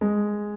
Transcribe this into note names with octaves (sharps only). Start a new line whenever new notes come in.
G#3